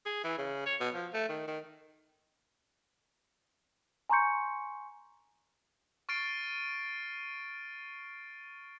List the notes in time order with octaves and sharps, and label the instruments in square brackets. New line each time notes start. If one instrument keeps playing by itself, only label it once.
[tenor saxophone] G#4
E3
C#3
C#5
B2
F3
A3
D#3
D#3
[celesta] G#5 A#5 C6 C#6 G6 C#7
[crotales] C#6 F6 A6 C7 D7 D#7